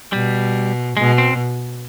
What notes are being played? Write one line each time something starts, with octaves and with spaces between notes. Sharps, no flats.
B2 G3
B2 G#3
C4